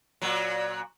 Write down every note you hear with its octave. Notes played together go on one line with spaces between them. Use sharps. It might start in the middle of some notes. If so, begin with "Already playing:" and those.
A#2 F#3